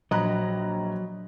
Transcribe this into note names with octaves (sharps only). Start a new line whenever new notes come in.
A#1 F#3 D#5 A#5 B5 F#6